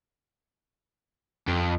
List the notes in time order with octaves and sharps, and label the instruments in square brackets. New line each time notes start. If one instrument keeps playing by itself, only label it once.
[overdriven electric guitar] F2